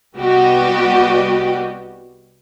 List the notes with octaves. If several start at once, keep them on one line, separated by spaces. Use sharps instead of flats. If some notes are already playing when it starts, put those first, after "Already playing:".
C2 G3 B3 F#4 G4 D#5